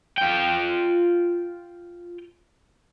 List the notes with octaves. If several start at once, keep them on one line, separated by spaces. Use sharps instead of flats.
F4 G5